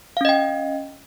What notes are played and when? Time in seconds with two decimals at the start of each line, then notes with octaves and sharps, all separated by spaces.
0.17 F5
0.21 C#4
0.25 D#5
0.29 G5